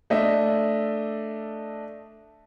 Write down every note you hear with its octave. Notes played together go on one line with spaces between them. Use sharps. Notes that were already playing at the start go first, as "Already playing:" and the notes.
A3 D4 D#5 E5